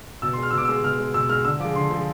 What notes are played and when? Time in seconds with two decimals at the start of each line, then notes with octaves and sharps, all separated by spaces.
0.22 B2 E6
0.33 C6
0.38 G#3
0.43 F6
0.51 E6
0.53 B2 D6
0.65 E6
0.69 G#3
0.83 B2 F6
0.99 G#3
1.14 B2 E6
1.30 G#3 F6
1.45 D3 E6
1.60 F3 D6
1.65 G#3
1.76 D3 C6
1.91 F3 G#3